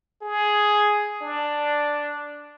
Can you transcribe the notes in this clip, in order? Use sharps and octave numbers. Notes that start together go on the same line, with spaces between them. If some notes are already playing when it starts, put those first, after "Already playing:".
G#4
D4